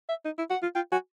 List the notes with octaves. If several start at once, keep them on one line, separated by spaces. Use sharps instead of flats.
E5
D#4
E4
F#4 F#5
F4
F4 G5
F#4 G#5